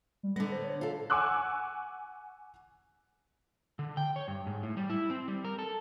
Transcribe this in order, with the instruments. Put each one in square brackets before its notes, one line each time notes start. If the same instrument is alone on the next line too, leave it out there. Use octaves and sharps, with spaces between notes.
[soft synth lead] G3
[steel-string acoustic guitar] D3 B3 [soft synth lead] A#6
[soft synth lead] C5
C#5
[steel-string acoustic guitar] F4 A4
[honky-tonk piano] F#5 G#5 C#6 D6 E6 F#6
[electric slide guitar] D3
G5
C#5
G2
G#2
A2
G3
E4
C4
G3
A#4
A4